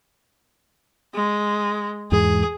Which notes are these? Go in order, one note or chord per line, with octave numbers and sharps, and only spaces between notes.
G#3
E2 G#2 G#4